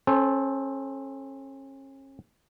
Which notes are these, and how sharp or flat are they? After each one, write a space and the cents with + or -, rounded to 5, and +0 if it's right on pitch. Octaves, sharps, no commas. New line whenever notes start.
C#4 -35 A4 -20 C5 +0